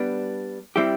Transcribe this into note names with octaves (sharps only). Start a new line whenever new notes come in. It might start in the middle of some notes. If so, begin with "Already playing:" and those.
Already playing: G3 B3 D4
G3 C4 E4 G4